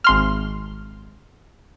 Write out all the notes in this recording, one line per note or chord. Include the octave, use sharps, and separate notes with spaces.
G#1 C6 F6